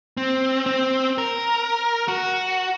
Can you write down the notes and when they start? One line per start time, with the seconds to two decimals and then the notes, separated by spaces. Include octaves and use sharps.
0.17 C4
0.66 C4
1.18 A#4
2.08 F#4